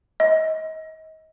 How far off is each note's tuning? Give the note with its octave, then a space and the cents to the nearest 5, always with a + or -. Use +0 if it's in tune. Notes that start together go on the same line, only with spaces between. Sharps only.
D#5 +30